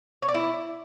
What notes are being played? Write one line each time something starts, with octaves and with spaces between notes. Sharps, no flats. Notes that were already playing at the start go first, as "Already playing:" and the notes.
C#5
D5
E4